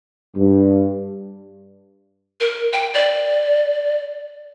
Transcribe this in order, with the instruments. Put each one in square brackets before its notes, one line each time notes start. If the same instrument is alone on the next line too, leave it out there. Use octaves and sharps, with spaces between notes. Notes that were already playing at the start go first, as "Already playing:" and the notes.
[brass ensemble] G2
[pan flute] A#4
G5
D5